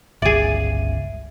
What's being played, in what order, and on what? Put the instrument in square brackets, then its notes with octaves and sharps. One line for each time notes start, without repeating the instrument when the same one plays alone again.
[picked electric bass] G1 C#2 [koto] G#4 D5 [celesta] E5 D#7